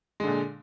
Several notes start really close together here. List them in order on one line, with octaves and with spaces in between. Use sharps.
G#3 D3 A#2